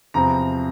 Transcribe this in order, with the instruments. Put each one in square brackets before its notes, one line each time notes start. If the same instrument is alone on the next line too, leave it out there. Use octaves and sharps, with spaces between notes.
[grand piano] E2 C3 F3 C4 A#5